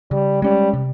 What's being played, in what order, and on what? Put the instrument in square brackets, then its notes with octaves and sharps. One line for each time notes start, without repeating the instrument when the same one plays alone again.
[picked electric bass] C#3 [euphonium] G3
[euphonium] G3 [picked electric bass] G#3 C#4
[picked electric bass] C3